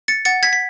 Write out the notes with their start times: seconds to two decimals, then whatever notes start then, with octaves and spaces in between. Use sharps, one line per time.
0.08 A6 C#7
0.25 F#5 A6 C#7
0.43 G#6 B6
0.53 B6